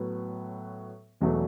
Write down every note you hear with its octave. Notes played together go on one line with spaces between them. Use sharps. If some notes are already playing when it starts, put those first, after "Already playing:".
Already playing: A2 F#3 B3
E1 E2 B2 F#3 A3